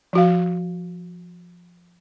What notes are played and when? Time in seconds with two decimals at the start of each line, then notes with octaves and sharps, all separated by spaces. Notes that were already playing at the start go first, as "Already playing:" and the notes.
0.13 F3 F#4 F5